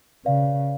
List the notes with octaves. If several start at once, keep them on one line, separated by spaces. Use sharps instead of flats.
C#3 B4 D5 F5